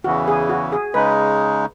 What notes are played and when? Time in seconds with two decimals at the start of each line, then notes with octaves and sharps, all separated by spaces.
0.04 E2 C#3 E3 F#4
0.28 G#4
0.49 F#4
0.72 G#4
0.94 C#3 G#3 D#4 B4